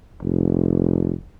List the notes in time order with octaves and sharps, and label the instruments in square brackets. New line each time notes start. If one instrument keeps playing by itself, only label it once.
[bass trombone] F1